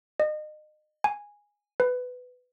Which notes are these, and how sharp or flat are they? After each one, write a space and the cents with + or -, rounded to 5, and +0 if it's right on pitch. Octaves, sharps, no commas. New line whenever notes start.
D#5 -30
G#5 -10
B4 +15